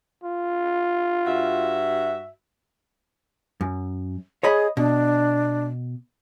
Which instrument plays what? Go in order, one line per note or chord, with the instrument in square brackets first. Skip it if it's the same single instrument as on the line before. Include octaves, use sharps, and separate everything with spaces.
[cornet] F4
[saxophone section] G2 F#4 E5
[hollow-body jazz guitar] F#2
[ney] G#4 [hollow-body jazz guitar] C#5 D#5 B5
[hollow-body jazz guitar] B2 [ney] D4